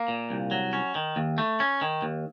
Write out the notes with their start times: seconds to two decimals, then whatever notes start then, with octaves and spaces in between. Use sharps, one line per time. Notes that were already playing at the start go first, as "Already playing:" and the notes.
Already playing: A#3
0.08 A#2
0.30 C2
0.51 F#3
0.73 C#4
0.95 D#3
1.16 D#2
1.38 A3
1.60 C#4
1.81 D#3
2.02 D#2